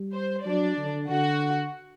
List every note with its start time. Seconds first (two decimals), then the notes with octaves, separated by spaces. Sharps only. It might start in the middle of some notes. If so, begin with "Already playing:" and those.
Already playing: G3
0.13 C5
0.45 F#3 D4 D5
0.77 D3
1.09 D3 F#4 F#5